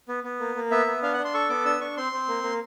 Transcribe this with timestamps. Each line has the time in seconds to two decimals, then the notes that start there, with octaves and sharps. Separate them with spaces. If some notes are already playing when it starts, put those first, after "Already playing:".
0.08 B3
0.24 B3
0.40 A#3
0.56 A#3
0.71 B3 E5
0.87 B3
1.02 D4 F5
1.13 F#5
1.18 D4
1.25 C6
1.34 A4 C#6
1.50 B3 D6
1.65 D4 E6
1.81 D4 C#6
1.97 C4 C6
2.13 C4
2.28 A#3
2.43 A#3